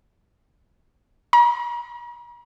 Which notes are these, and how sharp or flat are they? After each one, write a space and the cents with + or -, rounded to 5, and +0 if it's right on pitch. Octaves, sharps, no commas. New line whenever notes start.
A#5 +45